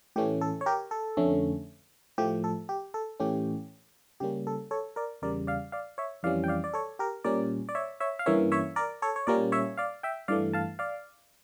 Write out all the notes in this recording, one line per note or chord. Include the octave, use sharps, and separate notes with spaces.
A2 E3 A3 C#4 G4
A4
C#5
G4 A#4
A4
F2 D3 A3 C#4
A2 F3 A3 G4
A4
G4
A4
A2 E3 A3 C#4 G4
C#3 G3 A#3 C#4 G4
A4
A4 C#5
A#4 D5
E2 C#3 G3 A#4 D5
D5 F5
D5 F5
C#5 E5
F2 E3 G3 C#4 D5 F5
G5
D5 F5
D5
A4 C#5
G4 A#4
A#2 G3 C#4 A#4 D5
D5
C#5 E5
C#5 E5
F5
G2 E3 A#3 C#4 C#5 E5
C#5 E5
A#4 D5
A4 C#5
C#5
A#2 G3 A#3 C#4 A#4 D5
C#5 E5
D5 F5
E5 G5
G2 E3 A3 D5 F5
F5 A5
D5 F5